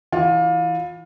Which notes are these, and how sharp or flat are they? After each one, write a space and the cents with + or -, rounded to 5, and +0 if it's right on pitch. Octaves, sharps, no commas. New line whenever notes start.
E3 -5 F4 +25